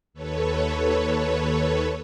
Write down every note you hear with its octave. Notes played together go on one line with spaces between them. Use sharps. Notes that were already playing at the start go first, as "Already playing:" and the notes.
D#2 A4 B4 C#5